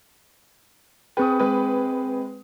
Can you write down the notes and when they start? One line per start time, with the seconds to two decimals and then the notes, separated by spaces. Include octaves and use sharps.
1.17 C4 G#4 B4 G5 D#6
1.39 G#3 B4